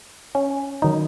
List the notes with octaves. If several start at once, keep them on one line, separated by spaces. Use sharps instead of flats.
C#4
D#3 F#3 D#4